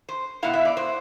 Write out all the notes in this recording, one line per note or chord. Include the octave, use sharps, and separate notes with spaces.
C5
B2 B3 E4 F5
E5
D5
C5